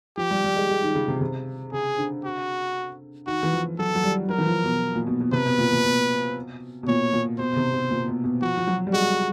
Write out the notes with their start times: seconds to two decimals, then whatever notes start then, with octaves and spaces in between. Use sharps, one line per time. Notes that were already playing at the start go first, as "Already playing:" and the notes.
0.17 F3 G4
0.31 G3
0.44 G3
0.56 G#3
0.70 G#3
0.83 D#3
0.95 C#3
1.08 C3
1.21 C3
1.72 C#3 G#4
1.98 D3
2.24 F#4
3.27 D#3 F#4
3.43 E3
3.53 F3
3.78 F#3 A4
3.95 F#3
4.04 G3
4.29 F#3 A#4
4.38 E3
4.47 F3
4.64 B2
4.95 A#2
5.07 B2
5.20 B2
5.32 C3 B4
5.46 B2
5.58 A#2
5.72 A#2
5.84 B2
6.83 B2
6.88 A#2 C#5
7.13 A#2
7.38 B2 C5
7.52 B2
7.56 C3
7.73 B2
7.91 A#2
8.08 B2
8.24 B2
8.42 F3 F#4
8.57 F3
8.67 F#3
8.87 G3
8.93 G#3 F#4